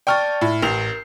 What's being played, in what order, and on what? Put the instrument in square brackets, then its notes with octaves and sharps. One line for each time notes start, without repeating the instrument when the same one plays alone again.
[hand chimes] D5 A5 A6 [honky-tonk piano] G5 C#6 F6
[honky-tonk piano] A2
[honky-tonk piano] A1 F7 [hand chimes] A#4 G6 C7